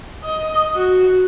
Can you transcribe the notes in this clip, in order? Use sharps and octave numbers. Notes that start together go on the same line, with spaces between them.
D#5
F#4